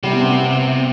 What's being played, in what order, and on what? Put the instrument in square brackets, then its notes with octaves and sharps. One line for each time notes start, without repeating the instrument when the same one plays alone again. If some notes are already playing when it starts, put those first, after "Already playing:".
[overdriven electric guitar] C3 [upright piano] G3
[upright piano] B3
C4
B3